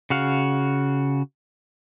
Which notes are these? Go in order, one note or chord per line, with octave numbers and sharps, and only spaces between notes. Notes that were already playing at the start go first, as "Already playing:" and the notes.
C#3 F#4 F5